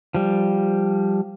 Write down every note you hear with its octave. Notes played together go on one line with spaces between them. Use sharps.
F3 G3